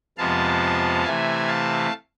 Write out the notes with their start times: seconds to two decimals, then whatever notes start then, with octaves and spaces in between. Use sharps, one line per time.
0.18 F2 C3 F3 G#3 B3 F5 A5
1.04 C3 E3 A3 E5 G#5
1.48 F5 A5